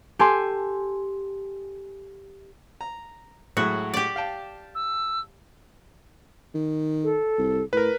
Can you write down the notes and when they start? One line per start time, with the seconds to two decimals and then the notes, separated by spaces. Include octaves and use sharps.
0.19 G4 A4 G#5 C6
2.81 A#5
3.57 A2 F#3 G#3 F#4
3.94 G4 D5
4.16 F5 G5 A5
4.75 E6
6.54 D#3
7.03 A4
7.38 C2
7.73 A2 A#4 B4